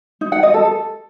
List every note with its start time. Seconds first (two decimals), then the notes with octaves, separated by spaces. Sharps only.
0.21 D#4
0.32 F#5
0.43 D#5
0.54 A4
0.65 A4